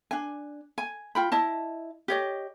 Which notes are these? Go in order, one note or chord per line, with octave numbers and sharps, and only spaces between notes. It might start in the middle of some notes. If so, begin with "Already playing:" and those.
D4 G#5
G#5
F4 G5 B5
E4 D#5 A5
G4 C#5 D#5